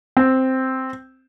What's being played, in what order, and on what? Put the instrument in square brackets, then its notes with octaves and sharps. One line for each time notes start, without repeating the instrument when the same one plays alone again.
[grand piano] C4